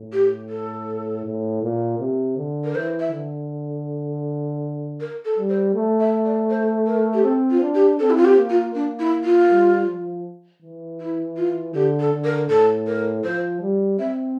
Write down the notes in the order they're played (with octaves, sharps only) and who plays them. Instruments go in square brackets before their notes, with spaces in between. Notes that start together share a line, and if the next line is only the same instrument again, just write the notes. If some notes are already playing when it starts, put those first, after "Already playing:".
Already playing: [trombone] A2
[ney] G4
A4
[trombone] A2
A#2
C3
D3
[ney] A#4
[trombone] E3 [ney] C5
[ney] E5
[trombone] D3
[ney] A#4
A4
[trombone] G3
[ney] C5
[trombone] A3
[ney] E5
D5
C5
A#4
G4
[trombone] C4 [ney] A4
[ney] F4
[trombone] D4
[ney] G4
[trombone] C4 [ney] A4
[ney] E4
F4
G4
[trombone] A#3
[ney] F4
[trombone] A#3 [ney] D4
[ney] E4
F4
[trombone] G3
F3
E3
[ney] E4
F4
[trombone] D3 [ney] G4
[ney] A4
[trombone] D3
[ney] A#4
[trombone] A2 [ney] A4
[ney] A#4
[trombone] F3 [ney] C5
[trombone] G3
[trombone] C4 [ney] E5